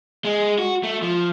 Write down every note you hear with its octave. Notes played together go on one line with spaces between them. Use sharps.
G#3
F#4
A3
F3